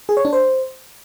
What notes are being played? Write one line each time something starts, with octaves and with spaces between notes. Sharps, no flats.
G#4
C#5
D4
C5